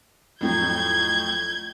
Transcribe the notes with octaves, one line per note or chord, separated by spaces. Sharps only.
F2 A2 F#3 G6 G#6